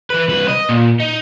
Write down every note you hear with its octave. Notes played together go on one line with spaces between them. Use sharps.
E3 B4
C2 B4
D#5
A#2
D#4